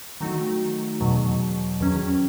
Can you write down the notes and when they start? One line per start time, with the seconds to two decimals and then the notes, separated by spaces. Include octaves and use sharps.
0.20 D#3 F#3 A3 D#4 F#4
1.00 E2 B2 F#3
1.80 E2 D#3 F#3 C#4